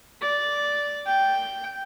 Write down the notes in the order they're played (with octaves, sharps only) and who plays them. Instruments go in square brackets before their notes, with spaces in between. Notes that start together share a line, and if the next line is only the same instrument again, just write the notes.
[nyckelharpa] D5
G5